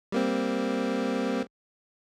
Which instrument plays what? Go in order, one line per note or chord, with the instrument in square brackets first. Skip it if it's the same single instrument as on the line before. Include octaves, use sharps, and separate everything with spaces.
[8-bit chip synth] G3 A#3 C4